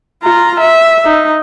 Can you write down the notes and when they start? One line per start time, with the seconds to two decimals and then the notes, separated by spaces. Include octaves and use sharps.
0.23 F4 A#5
0.61 E5
1.05 D#4